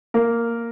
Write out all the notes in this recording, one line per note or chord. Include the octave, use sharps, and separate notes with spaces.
A#3 A#4